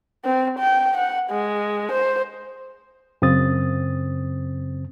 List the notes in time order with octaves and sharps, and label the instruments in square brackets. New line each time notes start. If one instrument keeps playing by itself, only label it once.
[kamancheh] C4
G5
F#5
G#3
C5
[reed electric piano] F#2 C#3 C4 D#6 A6